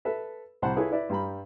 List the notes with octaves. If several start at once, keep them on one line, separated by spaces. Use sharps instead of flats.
A4 B4 E5
C2 C3 C5 F#5 A5 B5
E4 F4 G#4 A4 B4 C#5
E4 B4 D5 E5
G2 G3 A#5 B5